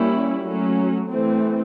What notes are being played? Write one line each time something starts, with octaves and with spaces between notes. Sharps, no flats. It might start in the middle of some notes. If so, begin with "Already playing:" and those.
Already playing: G3 A#3 C#4 E4
F#3 A3 C#4
E3 A3 C4